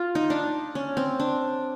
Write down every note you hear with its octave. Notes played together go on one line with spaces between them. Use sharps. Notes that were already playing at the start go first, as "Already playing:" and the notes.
Already playing: F4
D#4
D4
C#4
C4
D4